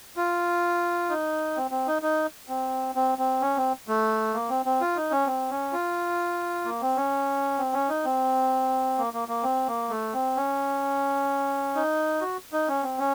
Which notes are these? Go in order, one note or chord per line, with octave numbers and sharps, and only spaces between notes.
F4
D#4
C4
C4
D#4
D#4
C4
C4
C4
C#4
C4
A3
A#3
C4
C4
F4
D#4
C#4
C4
C#4
F4
A#3
C4
C#4
C4
C#4
D#4
C4
A#3
A#3
A#3
C4
A#3
A3
C4
C#4
D#4
F#4
D#4
C#4
C4
C#4